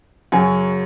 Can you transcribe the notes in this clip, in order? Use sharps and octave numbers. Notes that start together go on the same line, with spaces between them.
F#2 C#3 F#3 G#5